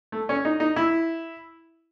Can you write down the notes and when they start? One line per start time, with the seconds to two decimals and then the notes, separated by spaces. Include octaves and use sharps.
0.12 A3
0.29 C#4
0.45 D#4
0.60 D#4
0.76 E4